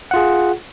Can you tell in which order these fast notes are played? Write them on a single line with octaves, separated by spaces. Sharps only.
F#5 F4 G#4